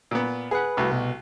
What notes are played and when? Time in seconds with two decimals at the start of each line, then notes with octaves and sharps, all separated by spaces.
0.11 A#2 B3
0.51 G#4 B4 F#5
0.77 C2 A3 F#4
0.92 B2